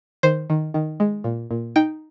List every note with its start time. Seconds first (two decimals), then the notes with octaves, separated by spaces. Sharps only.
0.23 D#3 C5
0.50 D#3
0.74 D#3
1.00 G#3
1.24 A#2
1.51 A#2
1.76 D#4 G5